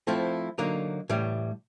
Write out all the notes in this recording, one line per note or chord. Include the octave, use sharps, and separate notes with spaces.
F3 A3 C4 E4
D3 F#3 A#3 D#4
A2 E3 G3